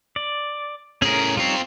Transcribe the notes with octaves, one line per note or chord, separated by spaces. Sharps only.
D5
A2 C#4 G#4 A#4
G3 C4 D#4 F4 C#5